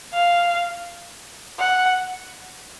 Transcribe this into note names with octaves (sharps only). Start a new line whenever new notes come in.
F5
F#5